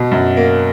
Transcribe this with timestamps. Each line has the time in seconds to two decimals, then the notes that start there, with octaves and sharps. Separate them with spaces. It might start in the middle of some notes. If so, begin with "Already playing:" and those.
Already playing: B2
0.11 F#2
0.37 A#3